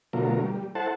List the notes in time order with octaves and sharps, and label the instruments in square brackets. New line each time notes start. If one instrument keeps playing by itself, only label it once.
[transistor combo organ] B2 D3 F#3 A3 F4 A#4
G3
E4 A4 C5 F#5 A5